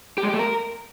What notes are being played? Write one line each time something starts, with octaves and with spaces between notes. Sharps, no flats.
G4
G#3
G4
A3
A#4